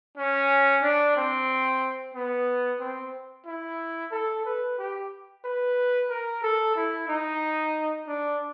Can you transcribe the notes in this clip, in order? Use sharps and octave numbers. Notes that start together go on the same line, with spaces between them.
C#4
D4
C4
B3
C4
E4
A4
B4
G4
B4
A#4
A4
E4
D#4
D4